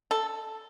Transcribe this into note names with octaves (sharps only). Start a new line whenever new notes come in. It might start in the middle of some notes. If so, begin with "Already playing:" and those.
A4